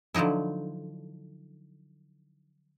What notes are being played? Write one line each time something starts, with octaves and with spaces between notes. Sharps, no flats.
D3 F3 F#3 D#4 E4